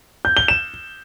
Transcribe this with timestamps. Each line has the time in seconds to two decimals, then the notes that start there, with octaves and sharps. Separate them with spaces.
0.25 G6
0.37 G7
0.48 E7